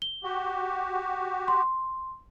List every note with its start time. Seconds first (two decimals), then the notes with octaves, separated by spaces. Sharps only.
0.02 G7
0.24 F#4 G4
1.48 C6